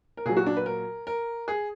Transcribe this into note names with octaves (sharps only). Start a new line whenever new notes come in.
A#4
A#2 F#3 G#4
F#4
D4
B4
A#4
A#4
G#4